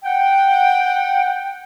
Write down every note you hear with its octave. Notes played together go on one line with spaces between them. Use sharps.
F#5 G5